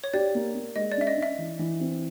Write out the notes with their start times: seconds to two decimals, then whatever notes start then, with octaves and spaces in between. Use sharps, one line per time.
0.04 C#5
0.14 G4 D5
0.35 A#3
0.55 A#3
0.76 G#3 D#5
0.92 D5
0.97 C#4 E5
1.07 D#5
1.17 C#4
1.23 E5
1.38 E3
1.59 E3
1.80 C4